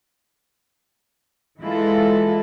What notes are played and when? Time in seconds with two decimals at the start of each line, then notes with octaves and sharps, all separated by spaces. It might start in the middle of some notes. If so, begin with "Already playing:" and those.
1.61 E3 G#3 E4 F4 A4